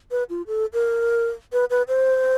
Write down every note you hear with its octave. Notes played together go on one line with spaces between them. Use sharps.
B4
F4
A4
A#4
B4
B4
C5